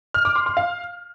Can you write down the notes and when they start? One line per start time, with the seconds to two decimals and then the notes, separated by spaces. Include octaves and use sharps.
0.14 F6
0.25 D6
0.36 C6
0.46 C6
0.57 F5